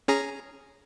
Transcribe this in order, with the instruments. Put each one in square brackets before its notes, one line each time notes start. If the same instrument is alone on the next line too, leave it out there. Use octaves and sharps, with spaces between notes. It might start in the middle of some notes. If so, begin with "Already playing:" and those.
[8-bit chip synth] C#4 G#4 A#5